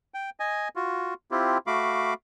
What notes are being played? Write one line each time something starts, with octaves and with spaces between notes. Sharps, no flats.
G5
D#5 G#5
F4 F#4
C4 E4 F4 G4
A3 F#4 F5 B5 D6